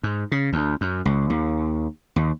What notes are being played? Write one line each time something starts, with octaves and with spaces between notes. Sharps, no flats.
G#2
C#3
D2
F#2
C#2
D#2
D#2